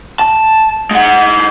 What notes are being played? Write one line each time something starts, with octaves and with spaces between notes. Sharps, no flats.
A5
G#3 F#5